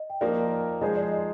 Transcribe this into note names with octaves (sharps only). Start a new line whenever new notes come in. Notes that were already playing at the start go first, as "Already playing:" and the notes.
Already playing: D#5
G5
F3 A#3 D#4 A#4 D5 F5
D5
F3 G#3 D#4 G#4 C5 D#5
D5
D#5